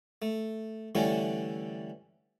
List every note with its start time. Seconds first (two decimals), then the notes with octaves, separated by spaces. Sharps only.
0.22 A3
0.95 D3 E3 G3 A3 C#4